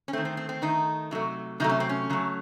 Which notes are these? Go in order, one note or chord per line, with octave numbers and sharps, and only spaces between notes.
C#4
D#3 A3 C4
C4
C4
C4
D#3 A3 D#4
C3 F#3 A3
C3 F#3 A3 D#4
C#4
C4
C#4
C#3 F#3 A3